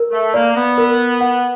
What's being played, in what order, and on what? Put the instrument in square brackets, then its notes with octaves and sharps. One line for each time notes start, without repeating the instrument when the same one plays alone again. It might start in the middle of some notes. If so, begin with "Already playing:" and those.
Already playing: [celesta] A#4
[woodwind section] A3
[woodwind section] A#3 [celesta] D5
[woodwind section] B3
[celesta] A#4
F#5